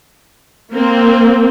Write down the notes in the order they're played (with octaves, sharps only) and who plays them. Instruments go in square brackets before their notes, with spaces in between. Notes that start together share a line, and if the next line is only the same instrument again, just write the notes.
[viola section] A#3 C4